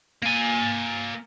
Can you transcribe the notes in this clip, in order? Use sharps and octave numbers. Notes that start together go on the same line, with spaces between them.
A#3 G#5